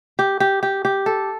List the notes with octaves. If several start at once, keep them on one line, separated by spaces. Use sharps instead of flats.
G4
G4
G4
G4
A4